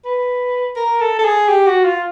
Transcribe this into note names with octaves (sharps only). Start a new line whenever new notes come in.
B4
A#4
A4
A4
G#4
G4
F#4
F4